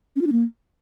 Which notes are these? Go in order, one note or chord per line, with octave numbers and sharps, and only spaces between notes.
C#4
F4
D4
A#3